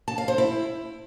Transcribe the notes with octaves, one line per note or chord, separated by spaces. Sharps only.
A5
F5
C5
E4